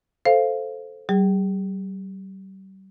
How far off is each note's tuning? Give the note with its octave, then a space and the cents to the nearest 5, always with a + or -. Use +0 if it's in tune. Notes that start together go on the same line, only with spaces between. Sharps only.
A4 +0 C5 +0 F5 -15
G3 -40 G#4 -35